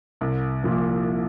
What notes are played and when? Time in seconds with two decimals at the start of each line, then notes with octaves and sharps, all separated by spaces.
0.21 C2
0.63 A#2 F3 A#3